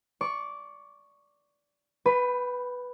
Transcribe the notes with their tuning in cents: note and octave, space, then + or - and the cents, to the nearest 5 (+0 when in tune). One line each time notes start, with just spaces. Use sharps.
D5 -15 C#6 +0
B4 +0 G5 -10 B5 +30